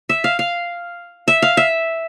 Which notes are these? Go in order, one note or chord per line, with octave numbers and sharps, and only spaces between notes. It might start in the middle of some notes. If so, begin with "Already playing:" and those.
E5
F5
F5
E5
F5
E5